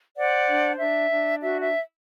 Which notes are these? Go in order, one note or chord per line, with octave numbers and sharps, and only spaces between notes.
C5 D5 F#5
D4
D4 E5
D4
F#4 E5
E5